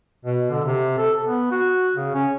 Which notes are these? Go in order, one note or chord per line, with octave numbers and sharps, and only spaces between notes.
B2
D3
C3
A4
B3
F#4
C#3
C#4